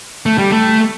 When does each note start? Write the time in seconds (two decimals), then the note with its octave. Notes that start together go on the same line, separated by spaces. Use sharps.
0.26 A3
0.38 G3
0.52 A3